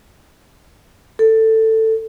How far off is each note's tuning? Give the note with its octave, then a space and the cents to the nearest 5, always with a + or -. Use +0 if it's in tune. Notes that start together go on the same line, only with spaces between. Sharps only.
A4 +15